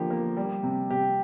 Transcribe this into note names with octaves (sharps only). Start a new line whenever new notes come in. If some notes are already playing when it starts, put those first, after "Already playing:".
Already playing: D3 F3 A#3 G4
A#3
G3
C3
C3 G4